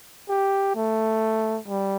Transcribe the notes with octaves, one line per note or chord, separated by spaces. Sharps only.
G4
A3
G3